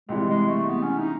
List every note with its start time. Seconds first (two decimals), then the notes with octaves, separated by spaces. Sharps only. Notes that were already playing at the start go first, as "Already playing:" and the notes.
0.09 C#2 C3 E3 G3 G#3
0.30 G#3
0.49 A3
0.69 B3
0.83 C#4
0.99 D#4